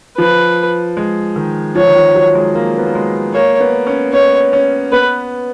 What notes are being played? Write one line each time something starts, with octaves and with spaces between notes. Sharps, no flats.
F3 B4
G#3
D#3
F3 C#5
D#3
F3
F#3
G#3
A#3
B3
A#3
G#3
A#3 C#5
B3
C#4
B3 C#5
C#4
B3 B4